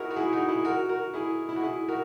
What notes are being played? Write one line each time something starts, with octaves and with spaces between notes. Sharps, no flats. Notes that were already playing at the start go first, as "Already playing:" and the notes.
Already playing: E4 F#4 G#4 A#4
F#4
E4 G#4
D#4 F#4
E4 G#4
F#4 A#4
F#4 A#4
E4 G#4
E4
F#4
E4 G#4
F#4 A#4